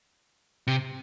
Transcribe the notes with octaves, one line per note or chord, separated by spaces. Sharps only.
C3